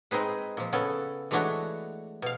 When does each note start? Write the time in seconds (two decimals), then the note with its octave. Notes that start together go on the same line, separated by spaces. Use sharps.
0.11 G#3 C4 D#4 G#4 B4
0.57 A#2 F3
0.72 C#3 B3 C#4 A4
1.31 E3 G#3 A3 D4 F#4 C#5
2.22 B2 F5